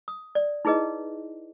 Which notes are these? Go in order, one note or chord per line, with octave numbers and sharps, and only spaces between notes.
D#6
D5
D#4 E4 G#4 B4 D#5